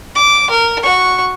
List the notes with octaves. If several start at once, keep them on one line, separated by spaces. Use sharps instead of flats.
D6
A#4
F#4 C#6